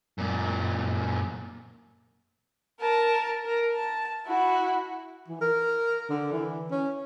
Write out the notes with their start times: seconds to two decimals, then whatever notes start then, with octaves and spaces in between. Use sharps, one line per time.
0.18 F#2 A#2
2.80 A#4 A5
3.46 A#4
3.75 A5
4.26 E4 F#4
5.28 E3
5.41 A#4
6.09 D3
6.32 E3
6.70 C#4